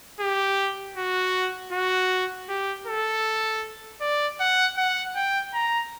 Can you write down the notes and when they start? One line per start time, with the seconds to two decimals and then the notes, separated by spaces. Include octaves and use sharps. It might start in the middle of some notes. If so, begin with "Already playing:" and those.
0.20 G4
0.96 F#4
1.72 F#4
2.49 G4
2.87 A4
4.01 D5
4.40 F#5
4.77 F#5
5.16 G5
5.54 A#5